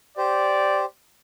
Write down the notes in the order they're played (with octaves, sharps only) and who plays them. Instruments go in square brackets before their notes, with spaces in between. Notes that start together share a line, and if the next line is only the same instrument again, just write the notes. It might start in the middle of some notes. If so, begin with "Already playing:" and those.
[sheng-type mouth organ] G4 C5 [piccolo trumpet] D5